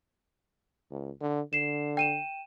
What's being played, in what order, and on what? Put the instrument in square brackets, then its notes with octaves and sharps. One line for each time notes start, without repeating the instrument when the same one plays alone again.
[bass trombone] C#2
D3
[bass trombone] D3 [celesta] C7 E7
[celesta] G5 D#7 E7